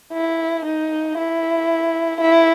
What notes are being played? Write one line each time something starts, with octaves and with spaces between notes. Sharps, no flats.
E4
D#4
E4
E4